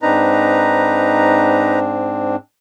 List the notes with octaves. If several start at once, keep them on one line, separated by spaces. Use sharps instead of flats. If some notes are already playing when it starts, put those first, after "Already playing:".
G#2 C4 D4 D#4 B4 A#5